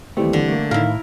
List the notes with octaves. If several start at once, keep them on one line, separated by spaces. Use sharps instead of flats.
D#2 E3 G3 A3 C4
D3
A3 A#3
A2 D#3 E4 A#4 F5